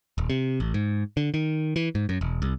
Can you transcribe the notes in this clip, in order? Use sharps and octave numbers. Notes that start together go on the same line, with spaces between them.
D#1
C3
A1
G#2
D3
D#3
E3
G#2
F#2
E1
C2